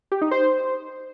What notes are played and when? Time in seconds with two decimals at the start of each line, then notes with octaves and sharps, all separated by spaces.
0.12 G4
0.21 D#4
0.31 C5